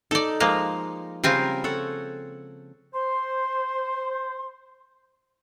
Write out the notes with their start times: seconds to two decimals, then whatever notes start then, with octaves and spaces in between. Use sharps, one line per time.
0.11 D#4 A4 D5
0.40 F3 G#3 A#3 A#5
1.24 C#3 G3 C4 F4 A#4 G#5
1.64 A4 C#5 F#5
2.94 C5 C6